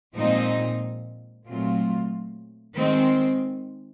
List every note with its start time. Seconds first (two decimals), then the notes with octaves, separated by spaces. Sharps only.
0.15 A#2 F3 G#3 C4 D#4
1.46 A#2 F#3 A3 C4 F4
2.77 D#3 G#3 C4